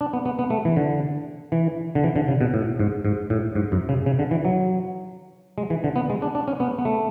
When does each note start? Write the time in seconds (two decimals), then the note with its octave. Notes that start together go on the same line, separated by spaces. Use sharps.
0.01 D4
0.13 B3
0.25 B3
0.39 B3
0.50 A3
0.65 E3
0.77 D3
1.52 E3
1.95 D3
2.04 E3
2.16 D3
2.28 C#3
2.41 B2
2.54 A2
2.79 G#2
3.05 G#2
3.30 A2
3.55 G#2
3.72 F#2
3.89 C#3
4.06 C#3
4.19 D3
4.31 E3
4.45 F#3
5.58 G#3
5.70 E3
5.84 D3
5.96 B3
6.10 G#3
6.22 D4
6.35 D4
6.48 C#4
6.60 B3
6.78 B3
6.85 A3